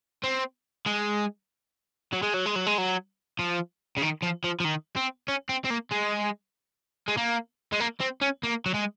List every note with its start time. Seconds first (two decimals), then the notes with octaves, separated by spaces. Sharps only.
0.23 C4
0.86 G#3
2.13 F#3
2.23 G#3
2.34 F#3
2.46 G#3
2.56 F#3
2.66 G#3
2.78 F#3
3.39 F3
3.97 C#3
4.02 D#3
4.22 F3
4.44 F3
4.60 F3
4.65 D#3
4.96 C4
5.28 C#4
5.49 C4
5.64 C4
5.70 A#3
5.91 G#3
7.08 G#3
7.17 A#3
7.73 G#3
7.80 A#3
8.01 C4
8.22 C#4
8.43 A#3
8.66 F#3
8.74 G#3